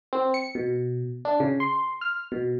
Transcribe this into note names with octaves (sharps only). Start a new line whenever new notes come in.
C4
C#7
B2
D4
C#3
C6
F6
B2